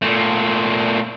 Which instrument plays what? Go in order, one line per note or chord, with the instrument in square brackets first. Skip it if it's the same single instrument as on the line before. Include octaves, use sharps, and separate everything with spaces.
[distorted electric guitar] A#2 A3